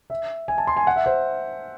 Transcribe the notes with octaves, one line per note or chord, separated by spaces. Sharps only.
E5
G#5
A5
C6
G#5
F#5
E5
C5